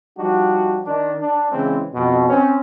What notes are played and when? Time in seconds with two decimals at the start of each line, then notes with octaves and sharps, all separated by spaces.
0.18 F3 G3 D4 D#4 F#4
0.86 D#3 D4
1.21 D4
1.52 C#3 E3 G#3 C4 C#4
1.94 F2 B2
2.29 C4 C#4